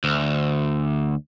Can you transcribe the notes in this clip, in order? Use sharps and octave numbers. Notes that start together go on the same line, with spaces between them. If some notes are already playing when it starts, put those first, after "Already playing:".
D2